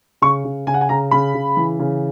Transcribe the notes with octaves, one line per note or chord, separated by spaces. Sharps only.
C#3 C#6
C#3
C#3 G#5
F#5
G#5
C#3 A#5
C#3 B5
C#3
E3
C#3